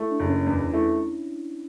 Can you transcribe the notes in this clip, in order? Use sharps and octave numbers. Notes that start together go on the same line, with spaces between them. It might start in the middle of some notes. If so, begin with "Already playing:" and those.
Already playing: A3 E4
D4
F#1
C#4
E2 D4
A3 E4